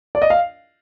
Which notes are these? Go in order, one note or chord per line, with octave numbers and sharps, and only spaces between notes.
D5
D#5
F5